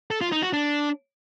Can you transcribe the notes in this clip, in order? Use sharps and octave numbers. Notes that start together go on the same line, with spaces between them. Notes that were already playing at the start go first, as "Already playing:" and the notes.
A4
F4
D#4
F#4
D4